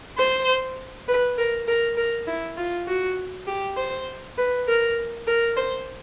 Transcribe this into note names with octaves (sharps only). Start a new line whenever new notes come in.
C5
B4
A#4
A#4
A#4
E4
F4
F#4
G4
C5
B4
A#4
A#4
C5